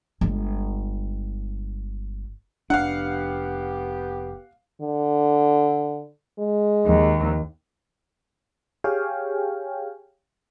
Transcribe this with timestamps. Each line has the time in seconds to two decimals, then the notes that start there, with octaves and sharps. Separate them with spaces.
0.21 G1 G#3
2.70 F1 B3 D4 G4 F5 F#5
4.81 D3
6.38 G#3
6.85 D#2
8.84 G4 G#4 C#5 F5 G5 G#5